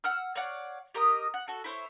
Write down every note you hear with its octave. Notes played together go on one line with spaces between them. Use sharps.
F#5 E6 F6
C#5 D5 F5 F#5
G4 A#4 D#5 D#6
F#5
F#4 A4
E4 C5 C#5